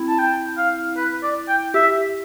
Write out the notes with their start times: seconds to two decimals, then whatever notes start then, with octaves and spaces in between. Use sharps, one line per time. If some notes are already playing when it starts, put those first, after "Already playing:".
Already playing: C4 E4
0.09 A5
0.19 G5
0.58 F5
0.97 B4
1.23 D5
1.48 G5
1.74 G4 E5